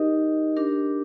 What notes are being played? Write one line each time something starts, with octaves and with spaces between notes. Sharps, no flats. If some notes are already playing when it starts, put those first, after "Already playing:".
Already playing: D#4 G4 A#4 D#5
D4 G4 A#4